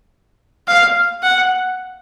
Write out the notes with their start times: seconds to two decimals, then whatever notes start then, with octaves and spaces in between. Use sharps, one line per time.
0.68 F5
1.23 F#5